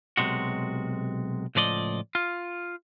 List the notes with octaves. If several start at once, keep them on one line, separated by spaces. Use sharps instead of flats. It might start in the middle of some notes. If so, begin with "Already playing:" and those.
B1 C3 G#3 F#4
C#2 A2 F3 D5 D#5
F4